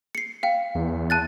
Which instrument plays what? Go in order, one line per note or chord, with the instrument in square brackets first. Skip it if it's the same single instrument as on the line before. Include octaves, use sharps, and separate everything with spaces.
[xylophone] C7 C#7
F5 G5
[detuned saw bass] E2
[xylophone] A5 F#6 A6